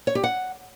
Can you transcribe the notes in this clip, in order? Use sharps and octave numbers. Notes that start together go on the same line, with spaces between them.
C#5
G4
F#5